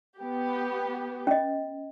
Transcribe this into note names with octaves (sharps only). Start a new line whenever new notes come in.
B3 G4
C#4 D#5